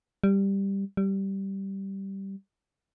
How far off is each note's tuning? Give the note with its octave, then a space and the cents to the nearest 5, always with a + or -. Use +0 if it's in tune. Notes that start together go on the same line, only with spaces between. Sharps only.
G3 +5
G3 -10